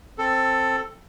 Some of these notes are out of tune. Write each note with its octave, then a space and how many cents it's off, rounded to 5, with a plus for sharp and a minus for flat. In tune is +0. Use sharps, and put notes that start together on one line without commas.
C4 +10 A4 +10